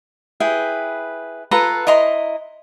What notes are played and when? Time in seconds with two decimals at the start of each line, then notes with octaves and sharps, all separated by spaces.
0.40 E4 G#4 B4 G5
1.51 F4 A4 B4 A#5
1.87 E4 D#5 A#5 C6